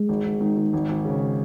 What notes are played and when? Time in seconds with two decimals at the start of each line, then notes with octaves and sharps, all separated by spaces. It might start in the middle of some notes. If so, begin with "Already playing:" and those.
Already playing: G#3
0.09 G#1
0.25 G#1
0.41 D#3
0.57 D#3
0.73 G#1
0.89 G#1
1.05 C#3